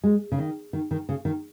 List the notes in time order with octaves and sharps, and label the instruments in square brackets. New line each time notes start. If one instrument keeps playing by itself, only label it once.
[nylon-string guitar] G#3
C#3
D#3
D#3
D#3
C#3
D#3